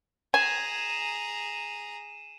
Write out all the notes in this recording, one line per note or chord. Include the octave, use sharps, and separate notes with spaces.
G#4 G#5 A#5 D#7 E7